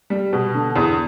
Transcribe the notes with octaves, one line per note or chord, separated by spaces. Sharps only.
G3
B2
D3
E2